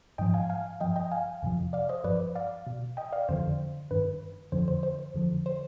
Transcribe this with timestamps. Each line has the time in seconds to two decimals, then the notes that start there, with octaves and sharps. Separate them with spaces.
0.18 G#2 F3 D#5 G5
0.34 F5 G#5
0.49 F5 G#5
0.80 G2 F3 D#5 G5
0.96 D#5 G5
1.11 F5 G#5
1.43 F2 C3 F3
1.73 D5 F5
1.89 C5 D#5
2.04 G2 F3 B4 D5
2.35 D5 F5
2.67 B2
2.97 D#5 G5
3.12 D5 F5
3.29 F2 D3 F3 C5
3.91 G2 D#3 B4
4.52 F2 D3 F3 C5
4.68 C5
4.83 C5
5.14 F2 D3 F3
5.46 C5